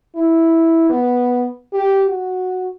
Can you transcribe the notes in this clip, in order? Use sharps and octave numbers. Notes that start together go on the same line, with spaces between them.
E4
B3
G4
F#4